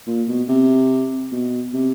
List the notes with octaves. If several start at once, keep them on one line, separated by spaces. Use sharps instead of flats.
A#2
B2
C3
B2
C3